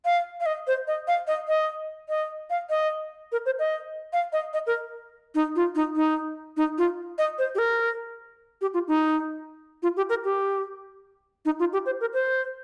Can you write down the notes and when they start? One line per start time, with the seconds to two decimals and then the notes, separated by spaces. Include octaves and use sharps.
0.05 F5
0.40 F5
0.46 D#5
0.67 C5
0.87 D#5
1.08 F5
1.27 D#5
1.48 D#5
2.09 D#5
2.50 F5
2.70 D#5
3.32 A#4
3.46 C5
3.59 D#5
4.13 F5
4.33 D#5
4.53 D#5
4.67 A#4
5.35 D#4
5.56 F4
5.75 D#4
5.96 D#4
6.57 D#4
6.78 F4
7.18 D#5
7.38 C5
7.55 G4
7.59 A#4
8.61 G4
8.74 F4
8.88 D#4
9.83 F4
9.97 G4
10.09 A#4
10.24 G4
11.45 D#4
11.59 F4
11.73 G4
11.86 C5
12.01 A#4
12.13 C5